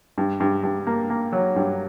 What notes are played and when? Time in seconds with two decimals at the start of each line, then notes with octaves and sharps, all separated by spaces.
0.18 G2
0.40 G2
0.63 G2
0.87 A#3
1.10 A#3
1.33 F#3
1.56 G2